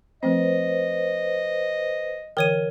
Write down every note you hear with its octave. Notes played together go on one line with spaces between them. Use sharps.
F3 A3 C4 B4 C5 D#5
D3 E3 A#4 C#5 G5 D#7